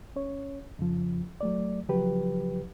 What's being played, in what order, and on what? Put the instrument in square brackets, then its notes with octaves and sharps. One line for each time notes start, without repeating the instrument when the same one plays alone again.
[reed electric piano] C#4 C#5
F2 C#3 F3
F#3 A3 D5
C#3 F3 F#3 G4 B4